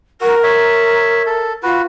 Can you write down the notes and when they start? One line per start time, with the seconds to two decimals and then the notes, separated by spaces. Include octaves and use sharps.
0.21 F#4 A#4
0.44 C#5 E5
1.26 A4
1.63 F4 F#4 B4